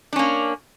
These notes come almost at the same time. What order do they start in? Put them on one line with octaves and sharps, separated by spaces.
D4 C#4 A#3